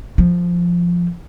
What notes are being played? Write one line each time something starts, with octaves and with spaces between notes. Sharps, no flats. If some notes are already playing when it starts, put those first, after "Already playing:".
F3